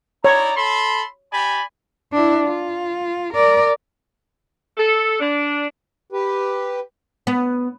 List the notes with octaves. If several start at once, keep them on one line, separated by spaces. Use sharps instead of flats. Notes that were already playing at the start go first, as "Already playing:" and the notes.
D#4 E4 C#5 D5 A#5
A4 B5 C6
G4 D5 G#5 B5
D4 E4
F4
A#4 D5
A4
D4
G4 B4
B3